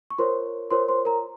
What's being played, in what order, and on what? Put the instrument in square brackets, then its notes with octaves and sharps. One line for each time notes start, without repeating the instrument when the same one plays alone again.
[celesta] C#6
F4 A#4 C5 C#5 C6
F4 A#4 C5 C#5 C6
C5 C6
A#4 A#5